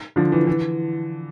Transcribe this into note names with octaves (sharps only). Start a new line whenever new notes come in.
D3 F3
E3
E3